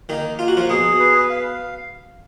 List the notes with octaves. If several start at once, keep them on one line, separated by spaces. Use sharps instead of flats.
D#3 A#3 D#4
A#3 F4
F#4
F3 F4
B2 B3 G#4
B4
F5